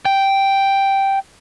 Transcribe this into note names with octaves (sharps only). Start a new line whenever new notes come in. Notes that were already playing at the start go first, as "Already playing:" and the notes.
G5